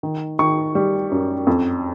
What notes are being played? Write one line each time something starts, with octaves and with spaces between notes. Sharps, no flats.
D#3
D#3 C#6
G3
F#2
F2